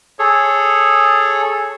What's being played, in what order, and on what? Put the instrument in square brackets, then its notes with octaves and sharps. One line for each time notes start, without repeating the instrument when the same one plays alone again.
[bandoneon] G#4 A4 C#5